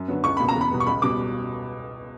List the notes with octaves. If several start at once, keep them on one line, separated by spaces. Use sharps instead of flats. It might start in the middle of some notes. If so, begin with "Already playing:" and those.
Already playing: F#2
D3 F#3 B3
C#2 C#6
B2 A#3 B5
A#5
E2
B5
B2 G3 B3
C#6
C#2 B5
B2 G3 D6